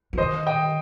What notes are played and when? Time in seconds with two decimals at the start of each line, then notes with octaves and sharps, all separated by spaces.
0.13 F3
0.18 D#3 C5 D#5
0.46 D#5 G5